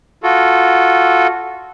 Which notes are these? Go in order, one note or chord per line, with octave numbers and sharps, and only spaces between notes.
F4 F#4 A4